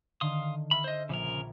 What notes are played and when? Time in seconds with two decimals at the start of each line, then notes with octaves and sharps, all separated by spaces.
0.21 D3 D#3 F5 C6 D#6
0.71 E5 B5 C6 F6
0.84 C5 D#5
1.09 A#1 C#3 F3 A#4 D6 G#6